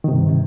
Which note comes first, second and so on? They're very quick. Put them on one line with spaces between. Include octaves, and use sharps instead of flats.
D#3 C3 G2